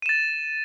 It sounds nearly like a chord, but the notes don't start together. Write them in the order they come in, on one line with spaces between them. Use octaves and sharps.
D#7 E7 A6